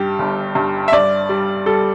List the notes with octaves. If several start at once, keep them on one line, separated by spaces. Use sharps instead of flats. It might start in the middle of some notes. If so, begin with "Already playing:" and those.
Already playing: G2 G3 G4
G1
G2
E5
G2 D5
G3
G3 A4